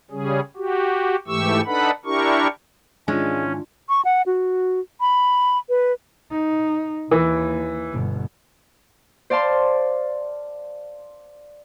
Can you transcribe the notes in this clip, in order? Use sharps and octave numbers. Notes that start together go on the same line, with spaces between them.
C#3 G3 C#4 G#4
F#4 G4
G#2 E3 A3 G4 C#6 E6
D4 D#4 A4 B4 F#5 B5
D4 E4 G4 A#4 C#6
G#2 D#3 E3 G#3 C#4 D4 F4
C#6
F#5
F#4
B5
B4
D#4
D#2 E3
G1 B2
C5 D5 F5 A5 C6